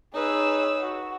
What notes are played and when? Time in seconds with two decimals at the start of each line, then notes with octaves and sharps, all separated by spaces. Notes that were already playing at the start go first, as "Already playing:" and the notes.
0.14 D#4 G#4 B4 C#5 E6
0.79 F#4